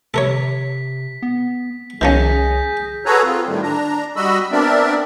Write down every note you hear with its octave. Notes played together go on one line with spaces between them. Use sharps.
C3 A4 A#4 C#5 B6
B3
C2 D#3 F3 C#4 G#4 G6 A#6 B6
F#4 G#4 A4 B4 C#5 A#5
C4 F4
A2 D#3 G3 A3
D4 A#5
G3 F#4 D#5 B5 E6
B3 C4 D4 A#4 D5 E5